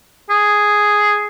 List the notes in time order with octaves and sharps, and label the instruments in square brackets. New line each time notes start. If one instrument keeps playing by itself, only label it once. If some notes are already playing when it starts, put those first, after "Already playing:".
[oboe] G#4